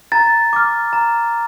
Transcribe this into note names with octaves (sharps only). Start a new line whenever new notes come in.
A#5 A6
D6 F6
A#5